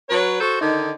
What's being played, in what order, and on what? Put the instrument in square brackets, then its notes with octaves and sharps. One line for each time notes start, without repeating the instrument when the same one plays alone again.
[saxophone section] F#3 B4 C#5
F#4 A4 C5
D3 D#3 D#4